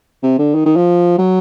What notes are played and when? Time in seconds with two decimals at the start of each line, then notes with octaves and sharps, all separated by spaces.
0.23 C3
0.39 D3
0.55 D#3
0.66 D#3
0.76 F3
1.18 F#3